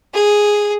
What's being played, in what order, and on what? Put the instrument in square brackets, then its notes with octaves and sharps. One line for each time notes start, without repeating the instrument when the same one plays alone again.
[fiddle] G#4